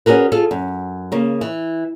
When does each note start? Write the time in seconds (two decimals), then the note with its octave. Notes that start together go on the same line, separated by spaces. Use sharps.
0.06 C#4 F#4 G#4 A#4 B4
0.32 F4 G#4 A4
0.51 F#2
1.12 C#3 A#3
1.41 E3